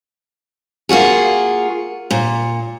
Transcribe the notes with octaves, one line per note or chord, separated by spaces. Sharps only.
A#3 F4 F#4 G#4
A#2